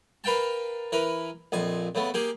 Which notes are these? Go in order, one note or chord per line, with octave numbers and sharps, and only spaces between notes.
A#4 B4 F5 G5 A5
E3 A#4 B4
A#1 F2 G#5
C#3 A3 B3
A#3 G4 G#4